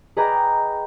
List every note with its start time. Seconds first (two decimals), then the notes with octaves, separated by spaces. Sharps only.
0.17 G#4 B4 D#5 G5 A#5 D6